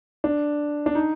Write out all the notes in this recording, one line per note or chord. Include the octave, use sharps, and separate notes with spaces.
D4
D4
D#4